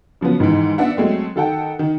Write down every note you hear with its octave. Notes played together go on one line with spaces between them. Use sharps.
C#3 F3 F#3 B3
G#2 D#3 E3
B3 D4 E5 F#5
F#3 G#3 A3 C4
D#3 A4 F#5 G5
D#3